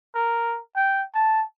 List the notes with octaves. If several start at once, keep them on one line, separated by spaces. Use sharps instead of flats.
A#4
G5
A5